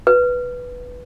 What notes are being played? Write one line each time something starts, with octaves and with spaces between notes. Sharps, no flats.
B4